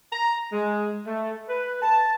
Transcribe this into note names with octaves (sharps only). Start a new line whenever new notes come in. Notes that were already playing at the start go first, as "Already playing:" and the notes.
A#5
G#3
A3
B4
A5